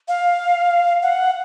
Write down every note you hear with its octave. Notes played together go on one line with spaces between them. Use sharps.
F5
F#5